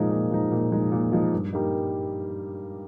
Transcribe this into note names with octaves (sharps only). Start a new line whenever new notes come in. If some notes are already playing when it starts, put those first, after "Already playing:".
Already playing: A#2 F3 G#3 D#4
A#2
F3 G#3 D#4
A#2
F3 G#3 D#4
A#2
F3 G#3 D#4
G2
G3 A#3 D#4